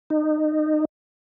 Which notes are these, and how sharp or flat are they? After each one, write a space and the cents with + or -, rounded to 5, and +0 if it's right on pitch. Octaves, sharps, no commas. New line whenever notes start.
D#4 -25